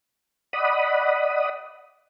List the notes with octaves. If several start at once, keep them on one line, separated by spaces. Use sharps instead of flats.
D5 D#5 F#5 B5 D#6